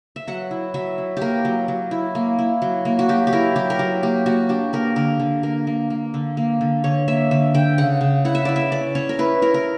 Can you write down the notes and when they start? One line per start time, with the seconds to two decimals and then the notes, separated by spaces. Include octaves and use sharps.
0.16 E5
0.27 F#3 F#5
0.51 E4
0.74 F#3 E5
0.98 E4
1.17 A#3 G4 A#4
1.45 F#3
1.68 F#3
1.91 E4
2.15 A#3
2.39 E4
2.62 F#3
2.85 A#3
2.99 F#4
3.09 F#3 G4
3.27 G4
3.33 E4 A#4
3.56 F#3 G4
3.70 A#4
3.79 F#3 G4
4.03 A#3 G4
4.26 A#3 F#4
4.49 D4 G4
4.73 A#3 A#4
4.96 D3 A#4
5.20 D3
5.43 A#3 A#4
5.67 A#3
5.90 A#3
6.14 D3
6.37 A#3
6.61 D3
6.84 D3 C#5
7.08 A#3 E5
7.31 D3 E5
7.54 D3 G5
7.78 C#3 F#5
8.01 C#3
8.25 E4 F#5
8.35 E5
8.45 E4 D5
8.56 E5
8.72 C#4 D5
8.95 C#4 C#5
9.09 A#4
9.19 E4 B4
9.42 E4 A#4
9.54 A#4